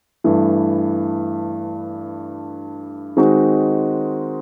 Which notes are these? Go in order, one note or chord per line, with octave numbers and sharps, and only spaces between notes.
G2 E3 A3
D#3 G#3 C4 D#4 F#4